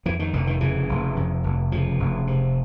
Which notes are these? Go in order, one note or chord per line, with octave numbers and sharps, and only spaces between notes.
F2 E3
D#3
F1 D3
D#3
C#3 E3
F1
F2
F1
C#3 F3
F1
C3